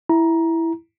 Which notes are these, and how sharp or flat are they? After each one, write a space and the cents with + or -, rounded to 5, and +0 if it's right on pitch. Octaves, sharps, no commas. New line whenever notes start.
E4 +0 A#5 +15